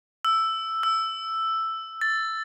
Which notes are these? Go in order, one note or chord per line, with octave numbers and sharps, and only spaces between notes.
E6
E6
A6